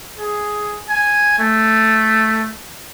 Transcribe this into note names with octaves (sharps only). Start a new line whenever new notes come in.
G#4
G#5
A3